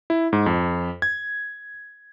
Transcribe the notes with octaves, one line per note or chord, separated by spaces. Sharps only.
E4
G#2
F2
G#6